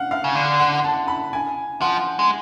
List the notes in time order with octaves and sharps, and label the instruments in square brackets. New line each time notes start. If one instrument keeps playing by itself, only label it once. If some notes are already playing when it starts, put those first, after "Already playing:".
Already playing: [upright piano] F5 F#5
F5
[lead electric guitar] C#3
D3
[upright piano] F#5
A5
B5
G#5
[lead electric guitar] F3 [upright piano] F#5
[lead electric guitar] G#3